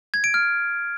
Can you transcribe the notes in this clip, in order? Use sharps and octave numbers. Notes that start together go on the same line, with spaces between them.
G#6
D7
F6